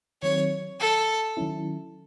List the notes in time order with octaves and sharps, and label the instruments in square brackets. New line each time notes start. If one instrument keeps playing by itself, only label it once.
[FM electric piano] D#3 F#3 C4 [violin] C#5
[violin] A4
[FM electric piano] D#3 F#3 C#4 E4